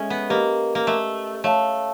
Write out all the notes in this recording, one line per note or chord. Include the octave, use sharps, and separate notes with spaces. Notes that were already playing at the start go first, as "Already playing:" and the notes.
Already playing: G#3 C#4 A4 C#5 E5
B3
A#3 G4 B4 D#5
A#3
A3
A3 C#5 F5 A5